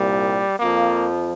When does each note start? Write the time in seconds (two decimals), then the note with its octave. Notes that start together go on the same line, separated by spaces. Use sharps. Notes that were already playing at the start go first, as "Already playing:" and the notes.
Already playing: C2 A#2 G3
0.59 F2 F3 A#3